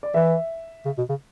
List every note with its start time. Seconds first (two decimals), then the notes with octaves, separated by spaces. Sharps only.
0.03 D5
0.14 E3 E5
0.85 C#3
0.98 B2
1.09 C#3